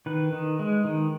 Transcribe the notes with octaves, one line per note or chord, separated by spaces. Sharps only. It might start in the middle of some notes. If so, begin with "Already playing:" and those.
D#3 B4
D#3
G#3
D#3